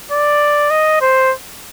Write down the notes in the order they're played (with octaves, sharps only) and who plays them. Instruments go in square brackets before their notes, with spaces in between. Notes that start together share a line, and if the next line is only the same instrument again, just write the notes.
[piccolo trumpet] D5
D#5
C5